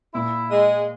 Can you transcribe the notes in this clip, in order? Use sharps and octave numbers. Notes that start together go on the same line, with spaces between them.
A#2 E4
G#3